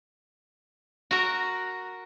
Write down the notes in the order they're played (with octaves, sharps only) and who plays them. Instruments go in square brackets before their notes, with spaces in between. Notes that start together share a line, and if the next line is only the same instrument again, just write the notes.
[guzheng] F#4 A#4